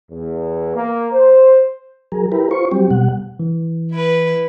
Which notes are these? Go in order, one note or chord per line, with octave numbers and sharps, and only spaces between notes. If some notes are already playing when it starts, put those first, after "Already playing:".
E2
A#3
C5
F#3 G#4 A#4
E4 G4 A#4 B4
F4 C5 C#6
F#3 G3 C4 G4
B2 G3 F#5
E3
E4 B4